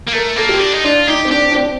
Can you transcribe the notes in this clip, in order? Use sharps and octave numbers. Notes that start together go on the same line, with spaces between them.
A#3
A3 A#4
A#3 A4
G4
C4
D4
D#4
D4 F4
D#4 G4
C4
D4 G4
D4
C4